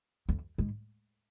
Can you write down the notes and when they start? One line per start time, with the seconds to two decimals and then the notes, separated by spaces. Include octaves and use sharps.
0.29 F2
0.58 G#2